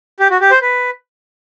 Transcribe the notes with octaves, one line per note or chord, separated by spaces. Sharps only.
G4
F#4
G4
C5
B4